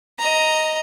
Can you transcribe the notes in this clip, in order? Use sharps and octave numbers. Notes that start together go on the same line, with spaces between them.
D#5 A#5